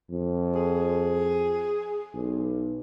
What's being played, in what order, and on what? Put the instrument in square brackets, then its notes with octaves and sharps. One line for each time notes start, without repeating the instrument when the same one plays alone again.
[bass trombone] F2
[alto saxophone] G#4
[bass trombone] B1